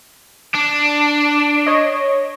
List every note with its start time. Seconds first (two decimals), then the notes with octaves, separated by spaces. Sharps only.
0.54 D4
1.67 C#5 D#5